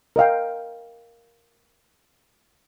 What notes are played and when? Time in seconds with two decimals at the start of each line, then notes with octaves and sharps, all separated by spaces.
0.16 A#4 D#5 F5 G5